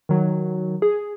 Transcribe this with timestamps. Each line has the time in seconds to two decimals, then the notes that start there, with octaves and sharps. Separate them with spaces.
0.09 D#3 F#3
0.82 G#4